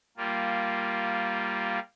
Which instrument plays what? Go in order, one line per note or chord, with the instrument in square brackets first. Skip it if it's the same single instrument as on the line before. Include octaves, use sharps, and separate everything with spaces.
[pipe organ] G3 A#3 F4